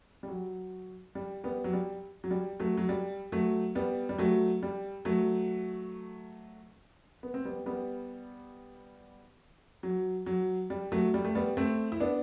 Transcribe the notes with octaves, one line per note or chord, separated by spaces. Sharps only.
G3
F#3
G3
G3 B3
F#3
G3
F#3
G3
F#3 A3
F#3
G3
F#3 A3
G3 B3
G3
F#3 A3
G3
F#3 A3
B3
C4
G3 B3
G3 B3
F#3
F#3
G3
F#3 A3
G3
A3
G3 B3
A3 C4
E4
B3 D4